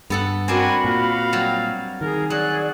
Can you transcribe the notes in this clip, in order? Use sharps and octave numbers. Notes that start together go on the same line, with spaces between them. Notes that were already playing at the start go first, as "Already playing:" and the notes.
G2 B3 A4 F#5
C4 D4 F#4 A#4 G#5 B5
A#2 F5
F#3 G3
D#3 G#4 A#4
F#3 G#4 D5 F#6